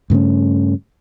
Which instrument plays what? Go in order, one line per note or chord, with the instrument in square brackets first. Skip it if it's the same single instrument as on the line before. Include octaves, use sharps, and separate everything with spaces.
[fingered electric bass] G2 C#3 A3 C#4